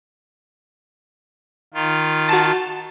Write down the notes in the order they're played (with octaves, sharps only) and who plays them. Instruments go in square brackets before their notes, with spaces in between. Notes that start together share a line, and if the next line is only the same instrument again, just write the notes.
[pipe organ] D#3 F4
[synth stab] F#4 A5